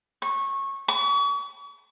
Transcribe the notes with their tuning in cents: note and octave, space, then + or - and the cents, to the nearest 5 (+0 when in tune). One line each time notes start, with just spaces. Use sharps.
C#6 -20
C#6 +40